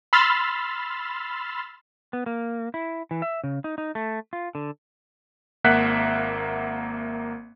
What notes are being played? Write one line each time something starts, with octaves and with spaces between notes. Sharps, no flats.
B5 C6 E6 F6 A6
B3
A#3
E4
E3
E5
C#3
D#4
D#4
A3
F4
D3
G#1 A#3 E5 F#5 F#6 B6